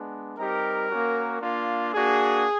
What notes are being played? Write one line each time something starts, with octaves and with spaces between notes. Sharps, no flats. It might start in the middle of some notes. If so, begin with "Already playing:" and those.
Already playing: G#3 B3 D4
G3 C4 D#4 G4 A#4
A#3 C#4 F#4
A#3 D4 F4
A#3 D4 F#4 G#4